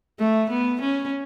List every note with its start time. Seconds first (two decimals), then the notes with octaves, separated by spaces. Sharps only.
0.20 A3
0.50 B3
0.81 C#4